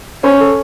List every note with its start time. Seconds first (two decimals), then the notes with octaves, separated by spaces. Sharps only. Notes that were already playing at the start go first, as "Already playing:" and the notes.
0.24 C#4 C5
0.40 A4